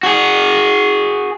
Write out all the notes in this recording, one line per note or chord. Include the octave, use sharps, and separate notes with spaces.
F#4 G#4